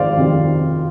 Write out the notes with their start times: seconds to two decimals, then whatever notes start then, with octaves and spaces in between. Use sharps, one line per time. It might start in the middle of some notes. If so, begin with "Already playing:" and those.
Already playing: F2 C3 D#3 C5 D5 F5
0.17 F2 C3 D#3